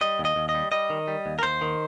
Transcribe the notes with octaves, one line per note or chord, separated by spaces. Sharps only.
G3 D#5
D#2
D#5
D#2
D#5
G3
G3 D#5
D#3
G3
D#2
A#4
D#2 C5
D#3